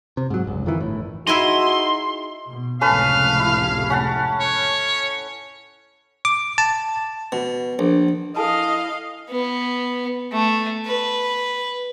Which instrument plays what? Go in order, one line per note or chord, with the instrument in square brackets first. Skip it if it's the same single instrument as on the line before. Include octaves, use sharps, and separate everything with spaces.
[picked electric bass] C3
G#2 F#3
F1 C#2
F2 D#3 E3
G1 A2
[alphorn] D#4 [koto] E4 G#4 D#5 [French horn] F#4 [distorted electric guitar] C6
[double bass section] B2
[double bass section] F1 C#2 A2 [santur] C#4 A4 B4 [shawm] F5
[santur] E4
C#4 F#5 A5
[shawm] C#5
[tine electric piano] D6
A5
[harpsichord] B2
A#1
[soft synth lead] E4 [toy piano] A4 G#5 A5 [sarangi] D#5 [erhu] F5
[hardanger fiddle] B3
A3
B4